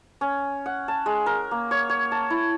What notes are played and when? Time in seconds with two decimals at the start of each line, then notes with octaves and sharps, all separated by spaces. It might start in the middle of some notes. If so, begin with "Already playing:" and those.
0.21 C#4
0.66 F#5
0.88 A5
1.06 G#3
1.26 A#4
1.51 A#3
1.71 C#5
1.89 C#5
2.12 A5
2.30 E4